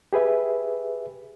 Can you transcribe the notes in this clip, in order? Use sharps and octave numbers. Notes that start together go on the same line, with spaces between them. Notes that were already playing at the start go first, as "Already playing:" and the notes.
G4 G#4 B4 E5